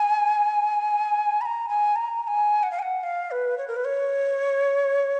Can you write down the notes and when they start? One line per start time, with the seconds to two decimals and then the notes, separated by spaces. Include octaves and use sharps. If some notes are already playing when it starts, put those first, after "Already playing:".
Already playing: G#5
1.41 B5
1.46 A#5
1.69 G#5
1.96 A#5
2.22 A#5
2.27 G#5
2.63 F#5
2.71 F5
2.79 G#5
2.82 F#5
3.03 F5
3.31 B4
3.58 C#5
3.68 A#4
3.76 B4
3.85 C#5